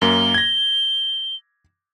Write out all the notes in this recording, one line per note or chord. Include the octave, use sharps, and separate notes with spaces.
F#2 A#3 G7
G#6 A#6